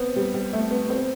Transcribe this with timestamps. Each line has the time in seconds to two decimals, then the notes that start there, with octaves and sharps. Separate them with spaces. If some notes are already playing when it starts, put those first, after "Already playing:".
Already playing: B3 C4
0.16 G3
0.34 G3
0.53 A3
0.71 B3
0.90 C4